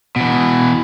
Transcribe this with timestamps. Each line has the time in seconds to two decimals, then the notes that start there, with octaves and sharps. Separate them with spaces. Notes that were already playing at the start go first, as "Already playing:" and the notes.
0.16 B2 E3